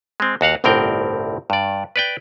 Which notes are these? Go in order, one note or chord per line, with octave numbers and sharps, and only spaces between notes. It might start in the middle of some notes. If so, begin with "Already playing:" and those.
G#3 C4
D#2 F#4 F5 F#5
G1 C2 A2 C4 A#4 G5
G2 D5
B4 D5 G5